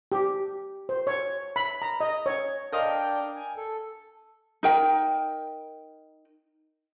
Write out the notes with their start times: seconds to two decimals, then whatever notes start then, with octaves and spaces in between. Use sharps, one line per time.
0.12 G4
0.89 C5
1.07 C#5
1.56 B5
1.82 A#5
2.01 D#5
2.26 C#5
2.72 D4 A#4 D#5 F5 G5
3.36 G#5
3.57 A4
4.63 D#4 A#4 G5